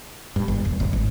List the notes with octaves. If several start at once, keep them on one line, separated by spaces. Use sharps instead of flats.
G2
G1
D#1
F#1
G#1